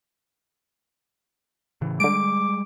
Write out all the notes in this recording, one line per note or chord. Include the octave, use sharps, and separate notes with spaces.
A2 C#3 E3
D3 G3 G#3 D6 D7